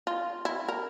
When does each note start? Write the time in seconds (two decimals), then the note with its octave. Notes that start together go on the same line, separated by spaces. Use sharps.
0.07 F4
0.45 E4
0.68 A#4